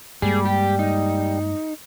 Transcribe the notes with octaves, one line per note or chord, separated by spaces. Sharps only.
G2 G3 G#3 A#3 G#4
G4
D#4